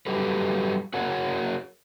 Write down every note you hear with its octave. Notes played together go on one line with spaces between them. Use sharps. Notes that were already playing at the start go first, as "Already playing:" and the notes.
F#3 G3 G4 A4 B4
F#4 G#4 A#4 C#5 F#5